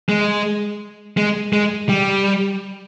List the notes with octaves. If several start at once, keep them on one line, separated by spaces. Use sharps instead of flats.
G#3
G#3
G#3
G3